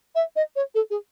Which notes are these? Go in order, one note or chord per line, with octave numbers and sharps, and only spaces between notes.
E5
D#5
C#5
A4
G#4